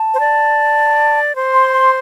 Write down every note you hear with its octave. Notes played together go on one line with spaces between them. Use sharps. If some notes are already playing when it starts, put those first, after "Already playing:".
Already playing: A5
C5
D5
C5
C6
C6